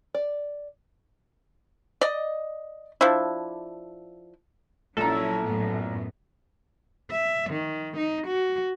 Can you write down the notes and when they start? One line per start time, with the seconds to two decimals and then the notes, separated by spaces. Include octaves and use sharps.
0.14 D5
2.01 D5 D#5
3.01 F3 D4 E4
4.97 A#1 F#3 C#4 E4 A4 A#5
5.44 F#2 A2 B3
7.11 E5
7.50 D#3
7.97 D#4
8.27 F#4